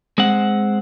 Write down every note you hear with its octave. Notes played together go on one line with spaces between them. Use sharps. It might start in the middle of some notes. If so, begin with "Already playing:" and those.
G#3 C4 F#5